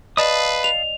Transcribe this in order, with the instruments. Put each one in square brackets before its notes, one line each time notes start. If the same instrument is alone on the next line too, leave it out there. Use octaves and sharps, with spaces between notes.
[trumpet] B4 [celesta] D5 D#5 [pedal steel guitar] F5 A5 D#6
[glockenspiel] F7